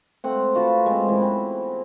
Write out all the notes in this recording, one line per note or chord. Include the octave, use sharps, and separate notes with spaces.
A3 C4 F#5
F4 F#4 B4 A5
G#3 C4
F#2 E3
E3 B3 C4